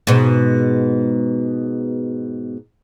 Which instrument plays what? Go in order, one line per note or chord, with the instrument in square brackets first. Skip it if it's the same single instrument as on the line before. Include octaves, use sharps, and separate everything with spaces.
[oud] G#2 B2